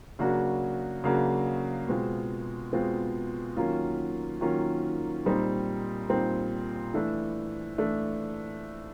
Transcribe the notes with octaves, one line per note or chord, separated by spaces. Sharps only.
C#3 F#3 A#3 D4 F#4
C#3 F#3 A#3 D4 F#4
B2 G#3 C4 F4
B2 G#3 C4 F4
D#3 F#3 A#3 C#4 F4
D#3 F#3 A#3 C#4 F4
A#2 G3 C4 D#4
A#2 G3 C4 D#4
E3 A3 D4
E3 A3 D4